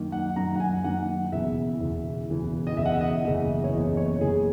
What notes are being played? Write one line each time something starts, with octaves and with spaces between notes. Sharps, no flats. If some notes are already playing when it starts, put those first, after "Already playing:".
Already playing: F#2 D#3 A#3
F#5
F#2 D#3 A#3 A#5
F#5
G#5
F#2 D#3 A#3 F#5
E1 E2 C#3 E3 E5
E1 E2 C#3 E3
E1 E2 C#3 E3
D#5
E1 E2 C#3 E3 E5
F#5
E5
D#5
F#1 E2 C#3 E3 A#3 E5
C#5
F#1 E2 C#3 E3 A#3 D#5
C#5
F#1 E2 C#3 E3 A#3 G#4